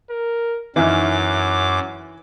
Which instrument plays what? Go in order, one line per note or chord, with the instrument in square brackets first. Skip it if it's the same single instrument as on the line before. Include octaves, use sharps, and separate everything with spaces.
[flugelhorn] A#4
[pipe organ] F#2 D6 [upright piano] E3 [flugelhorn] F#3 [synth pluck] D#4 E5 F6